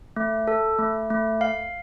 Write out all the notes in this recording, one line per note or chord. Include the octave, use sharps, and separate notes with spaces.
A3
A4
A3
A3
F5